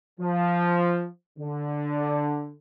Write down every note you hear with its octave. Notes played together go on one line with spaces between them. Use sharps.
F3
D3